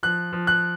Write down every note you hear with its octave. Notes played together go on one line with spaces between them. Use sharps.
F3 F#6
F3
F#6